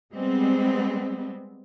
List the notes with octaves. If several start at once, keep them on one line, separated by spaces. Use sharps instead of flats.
G3 G#3 B3 C4